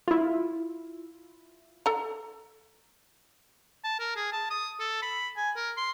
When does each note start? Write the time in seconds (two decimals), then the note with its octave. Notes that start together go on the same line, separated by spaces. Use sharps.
0.08 E4 F4
1.86 A4 A#5
3.84 A5
3.99 A#4
4.16 G#4
4.32 A5
4.50 D#6
4.79 A4
5.02 B5
5.37 G#5
5.56 A#4
5.77 C6